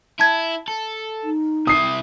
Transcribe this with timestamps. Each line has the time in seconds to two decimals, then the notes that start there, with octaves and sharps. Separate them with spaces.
0.20 E4 A5 G#6
0.68 A4
1.24 D#4
1.67 C3 E4 D#6 C7